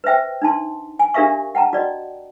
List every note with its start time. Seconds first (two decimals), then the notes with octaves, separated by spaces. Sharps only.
0.04 B4 C5 E5 G5
0.42 D4 D#4 A5 C6
0.99 G#5
1.14 D4 G4 A#4 E5 F5 C#6
1.55 F#5 G5 A5 A#5
1.73 F#4 D5 D#5